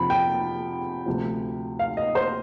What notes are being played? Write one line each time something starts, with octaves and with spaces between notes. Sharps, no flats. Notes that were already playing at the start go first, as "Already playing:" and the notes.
Already playing: F2 C3 F3 B5
G5
D2 C3 F3
F5
D#5
C5